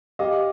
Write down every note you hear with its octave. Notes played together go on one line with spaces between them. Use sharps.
G4 D#5 F5